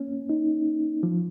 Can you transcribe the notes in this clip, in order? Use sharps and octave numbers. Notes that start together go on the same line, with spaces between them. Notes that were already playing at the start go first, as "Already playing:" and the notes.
Already playing: A#3 C#4
D#4
F3